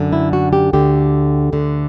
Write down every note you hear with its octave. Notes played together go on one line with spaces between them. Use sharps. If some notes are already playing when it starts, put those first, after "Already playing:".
Already playing: F#2 D3
E4
F#4
G4
D2 D3 G4
D2 D3